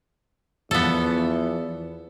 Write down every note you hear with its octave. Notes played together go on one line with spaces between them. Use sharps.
E2 E3 F3 B3 A4